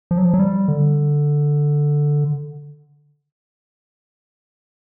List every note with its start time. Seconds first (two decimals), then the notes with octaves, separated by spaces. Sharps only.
0.11 F3
0.18 F#3
0.25 F3
0.34 F#3
0.39 G3
0.68 D3